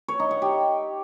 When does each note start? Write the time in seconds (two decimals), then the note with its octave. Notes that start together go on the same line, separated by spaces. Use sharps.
0.08 C#5
0.20 D#4
0.31 F#5
0.42 G4